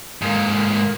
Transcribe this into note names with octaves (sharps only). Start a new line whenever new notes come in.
G#2 A#3